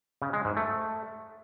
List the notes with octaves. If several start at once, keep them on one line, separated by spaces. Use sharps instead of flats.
C#3
G#3
G#2
A3